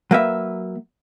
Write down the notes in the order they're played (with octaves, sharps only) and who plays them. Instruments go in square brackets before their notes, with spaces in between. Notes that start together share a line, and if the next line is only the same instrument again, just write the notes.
[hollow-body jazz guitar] F#3 A#3 B4 E5